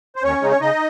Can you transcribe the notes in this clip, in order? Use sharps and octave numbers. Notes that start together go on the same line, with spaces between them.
C5
D#2 C#4 C#5
C#3 G#3 D#4
C#5
C#3 D#4 D#5